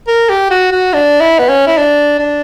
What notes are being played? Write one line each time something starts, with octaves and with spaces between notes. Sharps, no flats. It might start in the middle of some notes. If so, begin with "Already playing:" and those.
A#4
G4
F#4
F#4
D4
E4
B3
C#4
E4
D4
D4